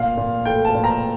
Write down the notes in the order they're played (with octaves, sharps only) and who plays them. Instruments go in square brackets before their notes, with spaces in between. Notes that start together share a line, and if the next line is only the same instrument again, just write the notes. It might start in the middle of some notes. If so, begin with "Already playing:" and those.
Already playing: [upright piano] A#2 F5
A#2
A3 G5
A5
A#2
A#5